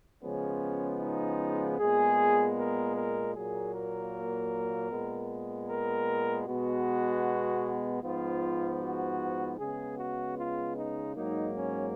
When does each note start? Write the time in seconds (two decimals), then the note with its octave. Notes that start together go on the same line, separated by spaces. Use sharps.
0.23 C#3 F3 G#3 B3 C#4
1.01 D#4
1.79 A#2 G#3 B3 G#4
2.57 A#4
2.97 A#4
3.35 A#2 F#3 A#3 G#4
3.74 A#4
4.92 A#2 G#3 B3
5.69 A#4
6.47 B2 G#3 B3 F#4
8.03 G#2 F3 B3 F4
8.82 F#4
9.59 C#3 G#3 B3 G#4
9.98 F#4
10.37 F4
10.77 D#4
11.15 G#2 F#3 A#3 D#4
11.55 C#4